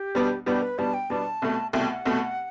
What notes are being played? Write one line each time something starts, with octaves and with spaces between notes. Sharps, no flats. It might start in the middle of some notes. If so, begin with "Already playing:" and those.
Already playing: G4
B2 G3 B3 D4
B2 G3 B3 D4 G4
B4
B2 G3 B3 D4 A5
G5
B2 G3 B3 D4 A5
C2 B2 A3
C2 B2 A3 G5
F#5
C2 B2 A3